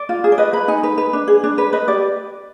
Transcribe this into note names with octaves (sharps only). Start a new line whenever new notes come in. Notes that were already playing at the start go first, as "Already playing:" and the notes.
Already playing: D5
F4
G#4
D5
B4 D#5
B4 B5
D#4 G#5
B4
B4
D4
G#4
D4
B4
B4 D#5
G4 D5